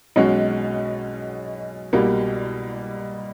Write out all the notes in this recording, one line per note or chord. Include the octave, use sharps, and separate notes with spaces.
B1 B2 G#3 C#4 F#4
C2 B2 G3 A#3